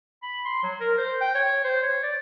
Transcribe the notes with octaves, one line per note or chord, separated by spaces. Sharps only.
B5
C6
F#3
A#4
C5
G5
C#5
C5
C#5
D5